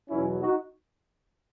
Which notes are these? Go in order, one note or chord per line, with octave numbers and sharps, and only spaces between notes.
E2 B2 F#3 C#4 E4
D#4 F#4